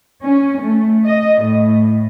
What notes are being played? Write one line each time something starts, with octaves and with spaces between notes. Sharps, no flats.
C#4
A3
D#5
A2